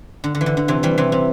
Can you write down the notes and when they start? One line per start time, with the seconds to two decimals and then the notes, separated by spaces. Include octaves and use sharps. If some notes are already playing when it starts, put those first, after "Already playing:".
0.24 D3
0.35 D3
0.41 E3
0.46 D3
0.57 D3
0.68 C3 E3
0.83 E3 G3
0.98 C3 E3
1.12 C3